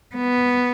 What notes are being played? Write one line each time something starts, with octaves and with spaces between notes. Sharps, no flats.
B3